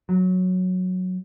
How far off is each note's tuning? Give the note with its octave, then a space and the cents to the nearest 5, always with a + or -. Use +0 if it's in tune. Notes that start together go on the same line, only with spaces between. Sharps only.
F#3 -10